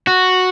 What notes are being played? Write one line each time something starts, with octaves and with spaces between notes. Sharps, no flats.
F#4